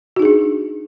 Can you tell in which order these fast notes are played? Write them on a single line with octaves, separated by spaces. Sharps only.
F#4 D#4 G#4 D4